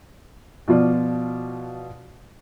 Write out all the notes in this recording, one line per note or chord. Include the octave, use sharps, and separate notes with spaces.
B2 F3 F4 D5